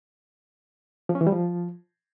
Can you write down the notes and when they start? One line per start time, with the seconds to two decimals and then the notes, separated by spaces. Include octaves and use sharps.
1.09 F3
1.15 C#4
1.21 E3
1.27 G3
1.32 F3